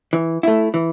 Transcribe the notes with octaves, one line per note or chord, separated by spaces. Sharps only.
E3
A3 E4
E3